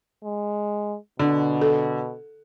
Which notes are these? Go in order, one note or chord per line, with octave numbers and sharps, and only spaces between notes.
G#3
B2 D3
A4